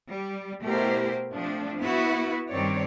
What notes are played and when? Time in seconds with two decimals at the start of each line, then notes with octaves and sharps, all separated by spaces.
0.11 G3
0.65 B2 A3 E4 G4 A#4 C5
1.36 F3 A3 C4 D4
1.80 B3 E4 F#4 B4
2.51 G2 D#3 G3 C4 C#5 D5